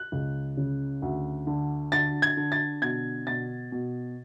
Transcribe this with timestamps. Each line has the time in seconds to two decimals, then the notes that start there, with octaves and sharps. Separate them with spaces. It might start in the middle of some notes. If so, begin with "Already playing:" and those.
Already playing: F#6
0.12 C#2
0.57 C#3
1.02 D2
1.47 D3
1.92 D3 A6
2.22 G#6
2.37 D3
2.52 A6
2.82 B2 G#6
3.27 B2 A6
3.72 B2